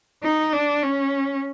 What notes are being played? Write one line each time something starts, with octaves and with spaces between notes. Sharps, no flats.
D#4
D4
C#4